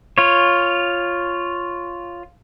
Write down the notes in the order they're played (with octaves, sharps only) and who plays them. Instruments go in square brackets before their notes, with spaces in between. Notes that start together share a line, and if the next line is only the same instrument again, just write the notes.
[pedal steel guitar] F4 C#5